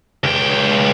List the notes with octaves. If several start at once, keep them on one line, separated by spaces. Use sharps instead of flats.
C#2 G5